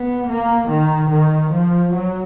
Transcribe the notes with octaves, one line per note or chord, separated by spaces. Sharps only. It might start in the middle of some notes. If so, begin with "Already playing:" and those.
Already playing: B3
A#3
D#3
D#3
F3
F#3